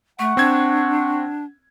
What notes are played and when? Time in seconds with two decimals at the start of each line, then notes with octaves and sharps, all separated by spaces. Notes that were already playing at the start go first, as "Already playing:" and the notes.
0.19 A3 F#5 C#6
0.37 C4 D4 G#6